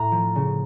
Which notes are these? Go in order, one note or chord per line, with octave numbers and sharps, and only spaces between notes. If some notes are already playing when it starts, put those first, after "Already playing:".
Already playing: A2 A#5
F3
C#3